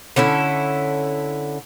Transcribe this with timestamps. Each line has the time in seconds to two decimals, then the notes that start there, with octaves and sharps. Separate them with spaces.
0.16 D3 C#4 E4 A4